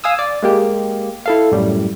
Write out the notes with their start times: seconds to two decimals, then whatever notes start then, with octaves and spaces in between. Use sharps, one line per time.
0.04 F5 G#5 D#6 E6
0.19 D5
0.42 G#3 A#3 G4
1.26 E4 A4 F5
1.52 F#2 A2 G3